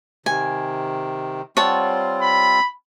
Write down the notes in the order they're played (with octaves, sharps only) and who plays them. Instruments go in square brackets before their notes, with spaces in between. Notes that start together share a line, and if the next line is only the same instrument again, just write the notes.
[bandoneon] C3 D#3 [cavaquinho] G#5
[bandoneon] G3 C4 F4 [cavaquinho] C#5 F#5 A5
[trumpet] B5